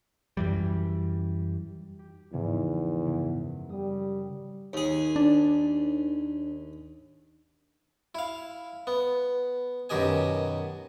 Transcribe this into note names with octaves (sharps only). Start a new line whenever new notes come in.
F#2 E3 G3
G4
E2 G#2 C#3 F3
F#2 C#3
G3 D#6
D#2 G#4
D4
E4 F5
B3
F#2 B2 D#3 G4 D#5 G#5